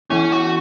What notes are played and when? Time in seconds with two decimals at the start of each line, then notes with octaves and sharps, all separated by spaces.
0.10 E3 B3 C#4 E4
0.32 F#4